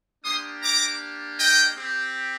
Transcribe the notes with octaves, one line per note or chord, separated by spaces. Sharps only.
A#3 D4 G4 C6 D#6
A#5 D6
D#5 G5
C4 G4